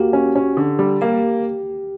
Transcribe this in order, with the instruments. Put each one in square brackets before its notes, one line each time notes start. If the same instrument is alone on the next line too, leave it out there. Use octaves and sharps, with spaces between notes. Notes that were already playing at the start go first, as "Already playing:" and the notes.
Already playing: [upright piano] A#3 [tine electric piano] F#4 G4
[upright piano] C#4
C#4
D3
G3
[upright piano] A#3 [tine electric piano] G4